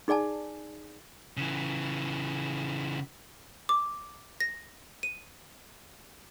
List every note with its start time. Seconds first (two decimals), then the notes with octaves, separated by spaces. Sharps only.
0.08 D#4 G#4 D5 G#5 A5
1.37 C#3 E3
3.69 D6
4.40 A#6
5.03 D#7